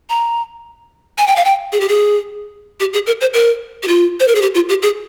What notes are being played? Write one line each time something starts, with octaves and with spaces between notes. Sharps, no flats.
A#5
G#5
G5
F5
G5
G#4
G4
G#4
G4
G#4
A#4
C5
A#4
G4
F4
C5
A#4
G#4
G4
F4
G4
G#4